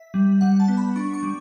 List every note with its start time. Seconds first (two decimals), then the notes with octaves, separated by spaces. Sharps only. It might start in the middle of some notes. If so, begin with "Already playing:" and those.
Already playing: E5
0.14 G3
0.41 G3 F#5
0.60 A5
0.68 B3
0.77 B5
0.96 D4 C#6
1.14 C#6
1.23 G3